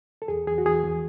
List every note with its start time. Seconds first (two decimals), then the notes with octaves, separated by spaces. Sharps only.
0.22 A4
0.28 E2 G#4
0.47 E2 G#4
0.58 F#4
0.65 E2 G#4
0.84 E2